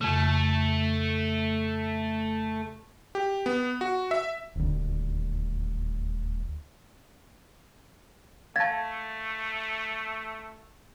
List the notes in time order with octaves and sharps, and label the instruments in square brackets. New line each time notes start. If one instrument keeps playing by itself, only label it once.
[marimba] F2 C#3 [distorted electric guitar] A3
[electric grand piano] G4
B3
F#4
E5
[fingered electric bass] D#1 D2
[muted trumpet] A3 [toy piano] F5 A5 [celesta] G#6 A6